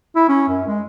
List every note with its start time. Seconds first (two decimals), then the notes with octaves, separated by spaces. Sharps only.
0.16 E4
0.29 C#4
0.49 F#2
0.67 G#3